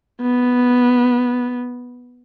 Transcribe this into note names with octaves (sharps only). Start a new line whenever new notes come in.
B3